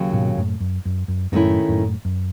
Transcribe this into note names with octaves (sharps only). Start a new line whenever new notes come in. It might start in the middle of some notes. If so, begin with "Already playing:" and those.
Already playing: D#2 C#3 F#3
G#2 B2
F#2 A2
F#2
F#2
F#2
F#2 A2 D#3 A3 C#4 E4
F#2 A2
F#2